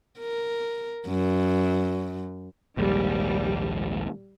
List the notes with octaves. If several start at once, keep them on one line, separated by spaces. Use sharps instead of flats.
A#4
F#2
A#1 D#2 G#2 G3